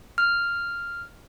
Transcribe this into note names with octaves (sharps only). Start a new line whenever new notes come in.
F6